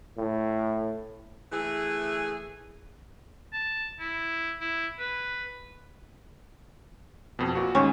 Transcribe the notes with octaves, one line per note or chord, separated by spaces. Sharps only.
A2
E3 A3 G#4
A5
E4
E4
B4
F2 B2
A#2 F#4
D#2 G#2 C#4